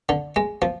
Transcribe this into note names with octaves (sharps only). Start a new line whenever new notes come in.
D3
G#3
F3